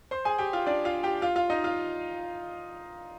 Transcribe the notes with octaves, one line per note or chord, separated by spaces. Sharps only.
C5 C6
G#4 G#5
G4 G5
F4 F5
D4 D5
F4 F5
G4 G5
F4 F5
F4 F5
D#4 D#5
F4 F5